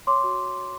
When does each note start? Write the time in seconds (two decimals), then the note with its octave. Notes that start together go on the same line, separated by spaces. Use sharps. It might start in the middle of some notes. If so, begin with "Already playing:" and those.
0.07 C#5 C6 D6
0.24 F#4